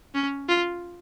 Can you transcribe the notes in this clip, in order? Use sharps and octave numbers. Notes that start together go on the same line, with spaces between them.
C#4
F4